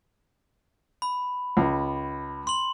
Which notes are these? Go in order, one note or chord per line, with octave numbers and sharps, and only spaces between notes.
B5
C#2
C6 F#7